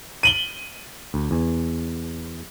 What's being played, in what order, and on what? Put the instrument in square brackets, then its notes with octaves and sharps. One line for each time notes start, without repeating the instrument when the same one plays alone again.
[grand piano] D#7 F#7 G7
[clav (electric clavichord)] D2
E2 G#5